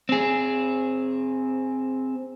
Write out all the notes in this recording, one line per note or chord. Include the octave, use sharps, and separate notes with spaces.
C4 G#4